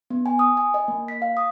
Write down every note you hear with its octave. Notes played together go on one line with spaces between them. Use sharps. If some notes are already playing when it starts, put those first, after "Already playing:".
B3
G#5
D#6
G#5
D#5
A#3
B6
F5
D#6